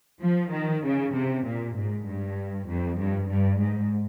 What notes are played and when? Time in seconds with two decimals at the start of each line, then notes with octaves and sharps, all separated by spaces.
0.22 F3
0.53 D#3
0.84 C#3
1.14 C3
1.45 A#2
1.75 G#2
2.07 G2
2.67 F2
2.99 G2
3.29 G2
3.59 G#2